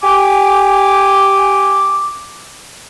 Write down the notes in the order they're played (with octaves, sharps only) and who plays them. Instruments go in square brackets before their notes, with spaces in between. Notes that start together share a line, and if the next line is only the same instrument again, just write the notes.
[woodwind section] G4 G#5 D6